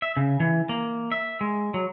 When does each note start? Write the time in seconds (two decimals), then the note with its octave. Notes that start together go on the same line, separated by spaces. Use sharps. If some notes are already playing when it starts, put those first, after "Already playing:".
0.02 E5
0.17 C#3
0.40 E3
0.69 A#3
1.12 E5
1.41 G#3
1.74 F#3